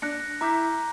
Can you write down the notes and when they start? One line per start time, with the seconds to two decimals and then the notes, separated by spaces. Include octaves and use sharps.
0.02 D4 F#6 A#6 C#7
0.41 E4 A#5 D6 G6 B6